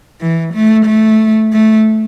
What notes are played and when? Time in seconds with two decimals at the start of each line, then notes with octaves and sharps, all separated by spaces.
0.21 E3
0.54 A3
0.86 A3
1.53 A3